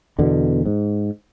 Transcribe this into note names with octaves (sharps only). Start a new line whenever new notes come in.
E2 B2 D3
G#2